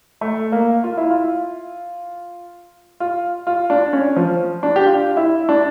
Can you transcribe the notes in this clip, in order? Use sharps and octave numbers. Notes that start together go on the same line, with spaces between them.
A3
A#3
F4
E4
F4
F4
F4
D4
C#4
F3
D4
G4
F4
E4
D4